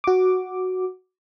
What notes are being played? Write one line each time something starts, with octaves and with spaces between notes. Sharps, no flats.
F#4 D6